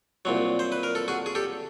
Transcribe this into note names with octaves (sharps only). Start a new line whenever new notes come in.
C2 A#2 F#3
C5
B4
A#4
A4
F#4 G#4
G#4
G4 A4